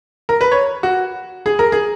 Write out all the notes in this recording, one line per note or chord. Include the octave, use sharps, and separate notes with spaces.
A#4
B4
C#5
F#4
G#4
A#4
G#4